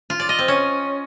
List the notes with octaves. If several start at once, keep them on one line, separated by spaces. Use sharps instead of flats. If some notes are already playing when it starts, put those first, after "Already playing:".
F4
D5
D#5
C4
C#4